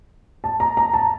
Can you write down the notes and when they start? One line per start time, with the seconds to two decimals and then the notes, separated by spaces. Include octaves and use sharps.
0.44 A5
0.60 A#5
0.77 A#5
0.94 A5